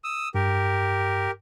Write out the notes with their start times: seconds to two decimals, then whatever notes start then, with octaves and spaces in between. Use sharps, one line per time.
0.04 D#6 E6
0.35 G2 G4 A#4